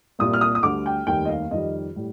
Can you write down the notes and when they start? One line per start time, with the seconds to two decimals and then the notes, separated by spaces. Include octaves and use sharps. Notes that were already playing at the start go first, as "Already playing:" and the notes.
0.19 C2 A#2 G3 D#6
0.33 F6
0.41 D#6
0.55 D#6
0.63 D2 D3 G3 D6
0.86 G5
1.07 F1 D#2 D#3 G3 G5
1.25 D#5
1.29 F5
1.51 F2 D#3 G3 D#5
1.96 A2 G3